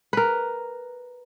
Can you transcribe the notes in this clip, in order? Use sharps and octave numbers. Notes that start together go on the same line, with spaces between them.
A#4 B4